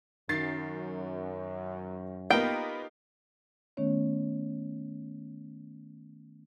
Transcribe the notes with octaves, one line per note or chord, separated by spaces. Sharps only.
F#2 D#3 A6 C7
A#3 B3 D#4 F4 G4 A#4 G5
D#3 A3 B3 C#4 C#5